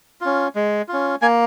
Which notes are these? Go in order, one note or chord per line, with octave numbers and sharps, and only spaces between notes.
C#4 F4
G#3
C#4 F4
A#3 G#5